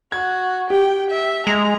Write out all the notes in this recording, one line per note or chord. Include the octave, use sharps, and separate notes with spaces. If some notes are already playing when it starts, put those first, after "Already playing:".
F#4 G#6
G4 G5
E5
G#3 A#5 F7